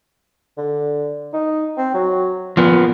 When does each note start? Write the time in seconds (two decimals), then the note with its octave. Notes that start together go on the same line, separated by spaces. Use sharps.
0.57 D3
1.34 D#4
1.77 C4
1.94 F#3
2.57 A#2 F3 B3